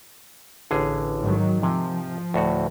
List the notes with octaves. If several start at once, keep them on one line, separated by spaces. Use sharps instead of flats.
A1 D3 G#4
G#2 D#3 F#3
C3 F3 G#5
D2 A2 F#4